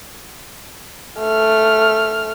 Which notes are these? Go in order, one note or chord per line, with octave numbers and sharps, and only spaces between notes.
A3 F6